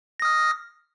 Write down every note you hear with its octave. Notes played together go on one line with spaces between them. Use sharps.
D#6 F6 A#6